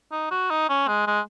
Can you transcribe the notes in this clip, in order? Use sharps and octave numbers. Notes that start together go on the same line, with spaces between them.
D#4
F#4
D#4
C#4
G#3
G#3